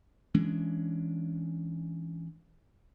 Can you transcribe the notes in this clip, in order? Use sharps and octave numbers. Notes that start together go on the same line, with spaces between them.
E3 G#3 C#4 D4